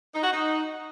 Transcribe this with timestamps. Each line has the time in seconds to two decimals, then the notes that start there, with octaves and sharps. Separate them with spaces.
0.15 D#4
0.23 F#4
0.32 D#4